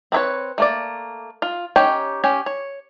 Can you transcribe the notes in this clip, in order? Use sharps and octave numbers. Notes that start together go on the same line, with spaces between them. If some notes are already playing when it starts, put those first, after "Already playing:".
C4 D#4 E4 B4 C#5
A3 A#3 D5
F4
C#4 D#4 G4 C#5 G5
C#4 G4 G#5
C#5